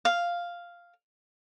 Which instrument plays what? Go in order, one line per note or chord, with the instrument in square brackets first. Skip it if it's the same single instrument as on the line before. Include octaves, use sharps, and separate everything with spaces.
[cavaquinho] F5